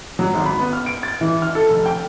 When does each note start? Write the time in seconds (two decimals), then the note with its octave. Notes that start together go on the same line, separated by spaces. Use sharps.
0.19 F#3
0.34 G#1
0.46 B5
0.59 B3
0.73 F6
0.86 D7
1.03 A6
1.21 E3
1.42 F6
1.55 A4
1.69 F1
1.86 G5